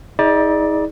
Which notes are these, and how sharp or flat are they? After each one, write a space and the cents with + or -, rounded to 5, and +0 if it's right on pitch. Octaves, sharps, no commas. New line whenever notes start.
D#4 +40 G#4 +5 D5 +10